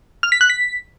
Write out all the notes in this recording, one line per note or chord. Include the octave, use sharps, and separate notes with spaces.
F6
B6
F#6
B6